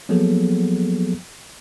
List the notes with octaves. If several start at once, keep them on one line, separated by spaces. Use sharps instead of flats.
F3 F#3 A#3 B3 G#4 A4